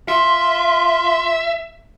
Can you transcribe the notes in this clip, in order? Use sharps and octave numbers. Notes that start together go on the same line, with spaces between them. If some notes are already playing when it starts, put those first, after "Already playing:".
F4 E5 C6